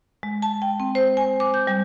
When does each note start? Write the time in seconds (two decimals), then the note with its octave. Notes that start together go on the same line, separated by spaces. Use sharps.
0.23 G#3
0.42 A5
0.62 G5
0.80 C4
0.95 C5
1.17 G#5
1.40 D6
1.54 G6
1.67 G3